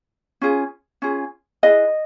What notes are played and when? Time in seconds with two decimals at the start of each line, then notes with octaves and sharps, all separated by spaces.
0.42 C#4 F4 G#4
1.02 C#4 F4 G#4
1.63 E4 G#4 B4 D#5